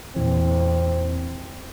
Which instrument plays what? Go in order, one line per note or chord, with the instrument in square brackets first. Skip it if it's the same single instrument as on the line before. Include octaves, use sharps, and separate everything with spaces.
[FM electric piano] E2 A#2 E3 [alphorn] C4